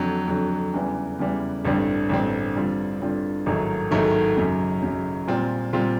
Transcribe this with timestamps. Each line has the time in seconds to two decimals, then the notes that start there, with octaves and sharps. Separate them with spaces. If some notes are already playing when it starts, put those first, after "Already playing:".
Already playing: F2 D3 F#3
0.28 F2 D3 F#3
0.74 E2 C#3 E3 G3
1.19 E2 C#3 E3 G3
1.65 A1 G2 D3 G3 C4
2.09 A1 G2 D3 G3 C4
2.55 G2 D3 G3 C4 F4
3.00 G2 D3 G3 C4 F4
3.46 A1 G#2 D#3 F#3 A3
3.91 A1 G#2 D#3 F#3 A3
4.37 F#2 C#3 F#3
4.82 F#2 C#3 F#3
5.28 A#2 G3 C4 F4
5.73 A#2 G3 C4 F4